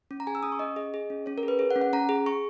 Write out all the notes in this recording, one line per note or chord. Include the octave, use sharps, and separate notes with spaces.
C#4
A#5
G#4 G#5
E6
C#4 D#6
C#6
C#4 D#5
G#4 D#5
G#4
C#4
C#4 C#5
A#4
G#4
B4
G#4 C#5
F#5
C#4
F#5
C#4 A#5
G#4
G#4 C#6